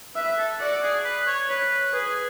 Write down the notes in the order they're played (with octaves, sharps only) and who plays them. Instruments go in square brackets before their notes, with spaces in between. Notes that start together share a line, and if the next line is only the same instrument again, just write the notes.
[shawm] B4 [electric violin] E5
[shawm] A4
[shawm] F#4 [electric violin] D5
[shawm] G#4
B4
C#5
[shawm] B4 [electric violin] C#5
[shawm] G#4 [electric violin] B4